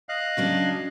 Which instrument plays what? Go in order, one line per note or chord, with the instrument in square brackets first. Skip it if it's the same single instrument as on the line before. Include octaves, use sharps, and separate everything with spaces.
[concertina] D#5 F5 F#6
[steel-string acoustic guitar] C#3 F#3 D4